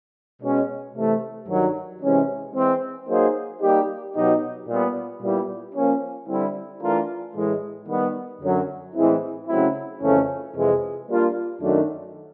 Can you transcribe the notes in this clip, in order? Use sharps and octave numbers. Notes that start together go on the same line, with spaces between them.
B2 G#3 C#4
C3 E3 A3
G2 D#3 F#3
C3 E3 G#3 C#4
E3 G#3 C4
F#3 A#3 D#4 G#4 C5
G3 A#3 D#4 G4
B2 F#3 B3 D#4 G4
A#2 G3 B3
A#2 G3 B3 E4 G4
F3 A#3 C#4
D3 G3 C4 E4
E3 A3 D4 F4 A#4
A2 E3 G#3
D#3 G3 B3
F#2 D3 F#3
A2 E3 G#3 C4 E4
C#3 F#3 A3 C4 E4
F2 C#3 E3 A3 C#4
F2 C3 E3 G#3
G3 A#3 D4 F4
F#2 D#3 F#3 A3 D4